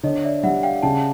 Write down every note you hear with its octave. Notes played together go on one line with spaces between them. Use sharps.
D3 C#5 D#5
D5 E5
G3 E5 F#5
F5 G5
C#3 G5 A5